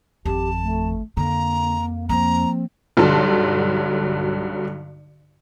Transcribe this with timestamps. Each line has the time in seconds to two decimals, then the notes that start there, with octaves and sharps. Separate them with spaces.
0.26 G#1 F2 G4 A5
0.63 A3
1.17 F2 D3 A#3 A#5
2.09 F3 A#3 C4 A#5
2.97 B1 G2 D3 F#3 A5 C6